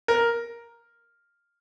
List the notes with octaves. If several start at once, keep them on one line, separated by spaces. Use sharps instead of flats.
A#4